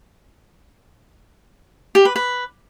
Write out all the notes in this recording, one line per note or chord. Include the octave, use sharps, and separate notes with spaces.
G4
B4
B4